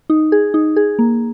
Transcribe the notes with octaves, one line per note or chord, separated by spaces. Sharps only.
D#4
G#4
D#4
G#4
A#3